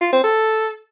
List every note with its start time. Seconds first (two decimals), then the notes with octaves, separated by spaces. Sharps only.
0.01 F4
0.13 C4
0.24 A4